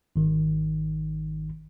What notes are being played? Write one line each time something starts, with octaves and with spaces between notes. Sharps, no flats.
G#1 D#3